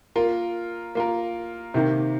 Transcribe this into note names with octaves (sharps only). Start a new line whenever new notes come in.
A#3 F4 A#4
A#3 F4 A#4
C3 D#3 A#3 G4